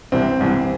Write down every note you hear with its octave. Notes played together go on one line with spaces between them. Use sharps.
C2 C3 E3 C4
C2 C3 E3